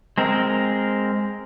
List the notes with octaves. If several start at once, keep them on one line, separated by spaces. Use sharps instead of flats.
G#3 C4 A#4